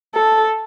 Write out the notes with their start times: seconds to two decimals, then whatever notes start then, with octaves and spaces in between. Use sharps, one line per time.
0.15 A4